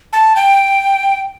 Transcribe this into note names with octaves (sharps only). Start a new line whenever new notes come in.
A5
G5